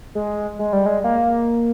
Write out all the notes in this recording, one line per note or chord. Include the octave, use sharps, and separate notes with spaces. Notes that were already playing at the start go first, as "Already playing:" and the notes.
G#3
G#3
G3
G#3
A#3